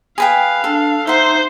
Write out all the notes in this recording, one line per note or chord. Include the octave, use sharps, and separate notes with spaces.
G#4 B4 F5 G5
D4 A4
D#4 C5 E5 F#5 C6